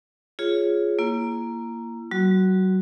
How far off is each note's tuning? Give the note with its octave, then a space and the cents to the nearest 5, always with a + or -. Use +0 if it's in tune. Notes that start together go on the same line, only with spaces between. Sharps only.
F4 +0 G#4 +0 C#5 +0
A#3 +0 E4 +40
F#3 +35 F#4 +0